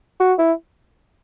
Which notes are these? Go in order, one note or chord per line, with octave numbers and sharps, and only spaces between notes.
F#4
E4